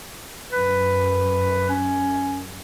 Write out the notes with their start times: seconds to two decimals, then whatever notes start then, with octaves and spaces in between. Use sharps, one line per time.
0.52 F#2 B4
1.69 C#4